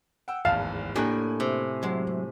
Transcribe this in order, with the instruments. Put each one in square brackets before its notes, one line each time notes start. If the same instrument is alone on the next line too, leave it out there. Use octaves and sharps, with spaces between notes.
[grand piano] F#5 G5 E6
[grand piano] D1 G#1 E2 [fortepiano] F5 [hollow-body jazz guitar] A5
[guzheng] A2 [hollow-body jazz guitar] A#3 D4 G4 [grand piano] G#5 F#6
[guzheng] C3
[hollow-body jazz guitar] F#3 G#3